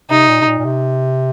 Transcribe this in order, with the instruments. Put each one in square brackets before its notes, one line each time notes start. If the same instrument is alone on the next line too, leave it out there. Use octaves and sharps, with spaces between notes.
[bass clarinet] C3 [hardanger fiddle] D#4
[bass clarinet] A#2
C3
A#2
A#2
C3